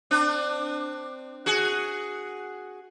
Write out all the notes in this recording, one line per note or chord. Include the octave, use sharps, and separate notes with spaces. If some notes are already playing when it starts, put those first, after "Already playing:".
C4 D4
F#4 G#4